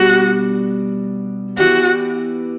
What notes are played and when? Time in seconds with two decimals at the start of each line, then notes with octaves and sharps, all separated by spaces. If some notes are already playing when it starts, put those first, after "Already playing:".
Already playing: B2 G3 D4 F#4
1.57 E3 B3 E4 F#4 G4 D5